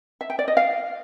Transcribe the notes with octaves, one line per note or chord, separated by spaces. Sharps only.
E5
G5
D5
D#5
F5